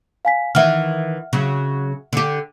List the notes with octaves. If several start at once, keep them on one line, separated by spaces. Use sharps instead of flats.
F5 G#5 B6
D#3 E3 E5 F#5 F6
C#3 F#3
D3 G4